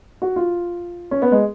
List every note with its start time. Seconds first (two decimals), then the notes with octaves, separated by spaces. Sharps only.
0.22 F#4
0.36 F4
1.11 C#4
1.22 B3
1.32 G#3